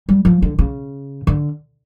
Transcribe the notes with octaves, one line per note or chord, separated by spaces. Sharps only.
G3
F3
D3
C#3
D3